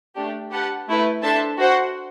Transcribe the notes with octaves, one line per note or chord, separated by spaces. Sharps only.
A3 D4 G4
G4 B4 F#5 A5
A3 E4 B4
D4 A4 C5 E5 A5
F#4 C5 F#5